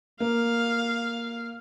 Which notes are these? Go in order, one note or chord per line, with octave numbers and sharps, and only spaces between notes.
A#3 F5